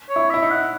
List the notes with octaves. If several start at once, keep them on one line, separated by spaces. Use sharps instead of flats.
C#5
E4
E4 E5
D#4
F#5